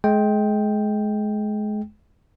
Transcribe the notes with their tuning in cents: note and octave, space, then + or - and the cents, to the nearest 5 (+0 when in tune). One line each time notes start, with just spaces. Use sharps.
G#3 +30 G5 +0